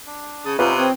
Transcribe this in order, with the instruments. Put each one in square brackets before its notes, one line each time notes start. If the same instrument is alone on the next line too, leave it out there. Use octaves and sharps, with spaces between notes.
[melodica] D4
[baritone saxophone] C#3 [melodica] A5 D#6
[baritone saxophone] C3 [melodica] C#4 D#4 F#5 [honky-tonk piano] F4 B4
[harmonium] C4 [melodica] C#5 D#6